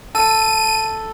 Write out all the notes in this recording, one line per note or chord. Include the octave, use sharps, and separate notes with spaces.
A4 D#7